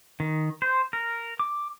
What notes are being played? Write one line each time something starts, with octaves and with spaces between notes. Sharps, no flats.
D#3
C5
A#4
D6